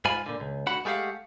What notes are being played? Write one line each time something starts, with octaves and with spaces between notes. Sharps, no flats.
G#2 F4 G#5 B5
A#2 D3
C#2
D2 F#4 F#5 B5
G#3 A3 G4 B4 F5 F#5